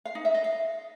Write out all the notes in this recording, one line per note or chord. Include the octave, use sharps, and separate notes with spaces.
F5
D#4
E5
D#5
F5